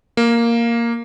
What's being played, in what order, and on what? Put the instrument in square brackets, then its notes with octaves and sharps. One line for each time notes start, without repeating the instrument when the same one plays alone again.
[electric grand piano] A#3